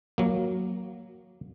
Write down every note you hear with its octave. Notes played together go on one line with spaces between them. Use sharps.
F#3 A#3